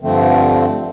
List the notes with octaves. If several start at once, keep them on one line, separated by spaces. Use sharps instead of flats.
G2 D3 F3 A3 C4